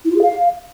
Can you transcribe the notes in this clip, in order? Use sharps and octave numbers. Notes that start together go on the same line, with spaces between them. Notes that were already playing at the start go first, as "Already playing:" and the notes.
E4
F4
G#4
F5